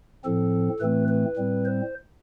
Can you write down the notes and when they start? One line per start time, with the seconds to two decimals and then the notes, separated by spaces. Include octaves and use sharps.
0.24 A2 F3 C4 A4
0.80 A2 E3 A3 C4 B4
1.08 B4
1.37 A2 G3 C4
1.65 C5